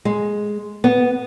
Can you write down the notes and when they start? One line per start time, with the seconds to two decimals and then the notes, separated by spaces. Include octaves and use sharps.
0.05 G#3
0.84 B3